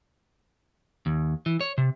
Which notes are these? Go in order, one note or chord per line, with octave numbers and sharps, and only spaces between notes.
D#2
E3
C#5
C3